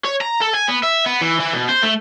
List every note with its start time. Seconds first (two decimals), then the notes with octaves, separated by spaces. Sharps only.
0.05 C#5
0.21 A#5
0.41 A4
0.53 G#5
0.68 B3
0.83 E5
1.06 B3
1.21 E3
1.40 E3
1.53 B2
1.69 C5
1.83 A3